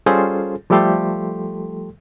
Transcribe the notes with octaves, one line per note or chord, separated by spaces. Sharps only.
G3 C#4 F4 G#4 A4 C5
F3 G3 A3 G4 A4 C6